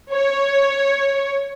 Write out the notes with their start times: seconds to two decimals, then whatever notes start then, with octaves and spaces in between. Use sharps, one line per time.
0.12 C#5